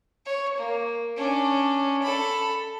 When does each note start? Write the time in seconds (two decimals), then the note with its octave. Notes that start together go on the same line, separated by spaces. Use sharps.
0.25 C#5
0.57 A#3
1.16 C#4 D4
2.02 A4 B5